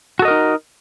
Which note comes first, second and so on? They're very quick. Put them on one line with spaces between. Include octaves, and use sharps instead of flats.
F#4 A4 D#5 A#4 D#4